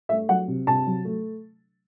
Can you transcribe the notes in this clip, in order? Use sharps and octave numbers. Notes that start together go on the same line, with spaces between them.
A3 E5
F#3 F#5
C3
C3 A5
F#3
A3